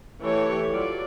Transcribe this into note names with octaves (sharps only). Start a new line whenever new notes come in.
E3 A3 E4 G4 A4 C#5
F#3 F4 D5